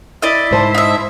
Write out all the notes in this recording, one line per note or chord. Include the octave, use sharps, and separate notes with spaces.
E4 D5 D#5
G#2 C5 A5
D#4 E5